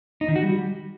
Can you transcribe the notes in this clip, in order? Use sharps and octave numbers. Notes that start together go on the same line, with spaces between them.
D#4
D#3
F#4
G3